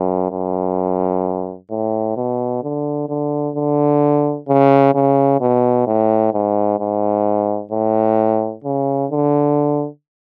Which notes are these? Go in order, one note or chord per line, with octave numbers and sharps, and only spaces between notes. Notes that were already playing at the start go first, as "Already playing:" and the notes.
Already playing: F#2
F#2
A2
B2
D3
D3
D3
C#3
C#3
B2
A2
G#2
G#2
A2
C#3
D3